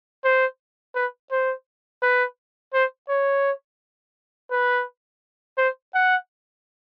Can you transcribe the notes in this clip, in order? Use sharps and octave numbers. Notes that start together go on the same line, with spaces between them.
C5
B4
C5
B4
C5
C#5
B4
C5
F#5